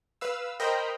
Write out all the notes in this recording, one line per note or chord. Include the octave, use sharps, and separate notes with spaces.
B4 F5 E6
A#4 C5 D#5 G5 A#5 B5